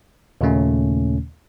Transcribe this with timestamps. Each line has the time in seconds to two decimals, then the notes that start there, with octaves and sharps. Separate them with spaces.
0.41 D#2 A#2 C#3 A3 C#4